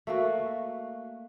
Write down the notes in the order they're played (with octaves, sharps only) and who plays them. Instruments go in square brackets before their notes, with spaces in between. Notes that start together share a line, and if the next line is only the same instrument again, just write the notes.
[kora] A3 A#3 F#4